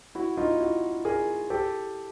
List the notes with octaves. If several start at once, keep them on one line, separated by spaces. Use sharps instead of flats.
E4 F#4
D#4 F4
E4 F#4
G#4 A#4
G4 A4